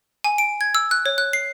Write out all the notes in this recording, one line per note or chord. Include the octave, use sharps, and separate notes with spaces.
G#5
D7
G#6
E6
F#6
C#5
F#6
C7